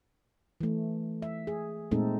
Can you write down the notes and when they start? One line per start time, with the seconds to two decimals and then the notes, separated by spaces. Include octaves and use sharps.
0.61 E3 A3
1.22 E5
1.47 G#4
1.91 A#2 G#3 A3 C4 D#4 A4